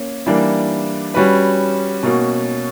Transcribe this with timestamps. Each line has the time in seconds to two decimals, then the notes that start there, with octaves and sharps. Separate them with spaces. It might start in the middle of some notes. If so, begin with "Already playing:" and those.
Already playing: A#3 C#4
0.26 E3 G3 A#3 D4
1.14 G3 C#4 F#4 B4
2.03 B2 A#3 C#4 F#4